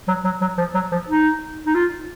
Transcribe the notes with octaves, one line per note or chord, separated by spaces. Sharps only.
F#3
F#3
F#3
F3
F#3
F3
D#4
D#4
F4